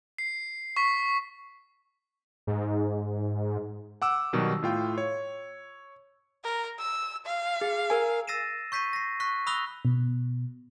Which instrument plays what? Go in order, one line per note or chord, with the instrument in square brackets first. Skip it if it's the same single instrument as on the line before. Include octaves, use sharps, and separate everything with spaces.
[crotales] C7
C#6 B6
[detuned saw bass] G#2
[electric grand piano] F#5 D6 E6
B2 D#3 F#3 G3
A2 F4 G5
C#5
[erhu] A#4
E6
F5
[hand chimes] G#4
A#4 G#5
[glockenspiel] E6 A6 A#6 C7 D#7 E7
C#6 G6 B6 C7 D#7
A#6 C7
C#6 F#6 B6
B5 D#6 E6 F#6 A#6 G7
[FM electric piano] B2